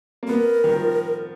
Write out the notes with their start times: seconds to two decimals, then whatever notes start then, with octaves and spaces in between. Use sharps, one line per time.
0.23 A#3
0.28 B3 A#4
0.64 D#3
0.75 F3